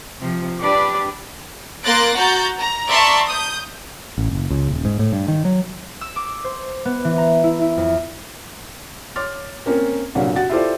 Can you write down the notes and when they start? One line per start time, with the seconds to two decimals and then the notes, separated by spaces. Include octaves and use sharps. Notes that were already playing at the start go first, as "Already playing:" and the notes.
0.22 C3 F3
0.60 D4 G4 B4 D5
1.84 A#3 C6 F#6 A6 A#6 D7
2.15 F#4 A#5 G6 A6
2.58 A#5
2.89 D5 E5 A5 A#5 C6 C#6
3.27 D#6 G6
4.18 A1
4.31 F#1
4.50 C#2
4.69 D#1
4.85 G#2
4.99 A2
5.13 G2
5.28 D#3
5.45 F#3
6.01 E6
6.16 D6
6.44 C5
6.85 B3
7.04 E3
7.18 A#5
7.44 E4
7.62 E4
7.77 F2
9.16 C#5 C6 D6 F6 A6
9.66 A#3 C4 C#4 A#4
10.15 C2 A#2 D3 F#3 C#5 F5
10.35 F#4 F#5 A6
10.50 E4 F4 G4 A4 C5 D5